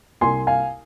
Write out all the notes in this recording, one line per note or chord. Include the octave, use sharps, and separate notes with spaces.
C2 G#5 C6
F5 G#5